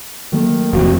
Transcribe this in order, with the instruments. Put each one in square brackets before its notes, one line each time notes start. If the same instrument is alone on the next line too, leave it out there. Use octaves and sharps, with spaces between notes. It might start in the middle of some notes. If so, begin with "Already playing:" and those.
[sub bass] D#3 [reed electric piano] F#3 A3 A#3
[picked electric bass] F1 F2 [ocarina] F#4